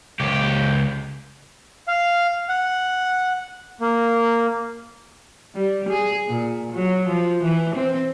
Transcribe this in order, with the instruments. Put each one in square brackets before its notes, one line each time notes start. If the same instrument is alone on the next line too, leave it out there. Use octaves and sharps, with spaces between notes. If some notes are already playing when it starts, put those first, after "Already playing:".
[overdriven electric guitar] C#2 G4
[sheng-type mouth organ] F5
F#5
A#3
[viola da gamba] G3
G#4
A#2
F#3
F3
E3
C4